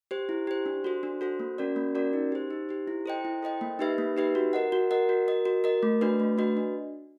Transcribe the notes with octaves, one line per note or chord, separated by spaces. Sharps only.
G4 C5
E4
G4 C5
D4
F#4 A4 C5
D4
F#4 A4 C5
A#3
C#4 F#4 A#4 D5
A#3
C#4 F#4 A#4 D5
D#4
G4 C5
D#4
G4 C5
E4
A4 C5 D#5 G5
E4
A4 C5 D#5 G5
A#3
D#4 G4 B4 E5
A#3
D#4 G4 B4 E5
F#4
A#4 D#5 F#5
F#4
A#4 D#5 F#5
F#4
A#4 D#5
F#4
A#4 D#5
A3
D4 F#4 B4 D#5
A3
D4 F#4 B4 D#5
D4